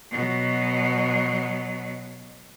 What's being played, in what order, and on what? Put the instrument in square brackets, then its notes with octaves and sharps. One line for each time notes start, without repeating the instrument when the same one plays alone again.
[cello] B2 F#3